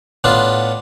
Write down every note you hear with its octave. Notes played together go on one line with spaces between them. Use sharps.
A2 B3 D4 F4